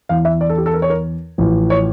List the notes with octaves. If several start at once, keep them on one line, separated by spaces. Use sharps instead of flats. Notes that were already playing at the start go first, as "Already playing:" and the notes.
E2 E3 F5
E5
D5
A4
G4
A4
A#4
C#5
A#4
A1 A2 F3
C#5